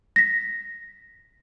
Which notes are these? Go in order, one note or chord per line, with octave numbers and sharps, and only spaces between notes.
A#6 B6